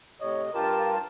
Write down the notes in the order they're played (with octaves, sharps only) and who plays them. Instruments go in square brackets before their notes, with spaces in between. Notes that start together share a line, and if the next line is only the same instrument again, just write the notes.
[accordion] A2 C3 [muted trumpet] C#5 [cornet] D#5
[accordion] G2 F4 A5 [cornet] G4 [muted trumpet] A#4